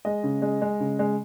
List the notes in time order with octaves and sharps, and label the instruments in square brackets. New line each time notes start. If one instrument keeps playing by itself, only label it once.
[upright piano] G#3 D#5
C#3
G#3
G#3
C#3
G#3